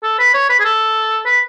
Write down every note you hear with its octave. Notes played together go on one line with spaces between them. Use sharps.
A4
B4
C#5
B4
G#4
A4
B4